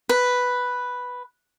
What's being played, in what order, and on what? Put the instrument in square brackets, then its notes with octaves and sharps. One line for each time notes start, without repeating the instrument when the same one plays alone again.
[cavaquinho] B4